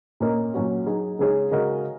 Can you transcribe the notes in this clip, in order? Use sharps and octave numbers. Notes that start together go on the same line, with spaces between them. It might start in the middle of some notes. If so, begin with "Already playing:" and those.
A#2 A#3 C#4 A#4 D#5
A#2 F#3 C#4 F#4
F#3 D#4 G#4
C#3 G#3 D#4 G#4 C#5
C#3 G#3 F#4 A#4 D#5